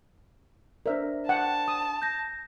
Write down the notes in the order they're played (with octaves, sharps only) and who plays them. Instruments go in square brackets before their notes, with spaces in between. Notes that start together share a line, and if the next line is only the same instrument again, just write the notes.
[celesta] D4 C5 D5 [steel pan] A#4 E5
[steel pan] F#5 G5 [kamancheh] A5
[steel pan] D#6
[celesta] G6 A#6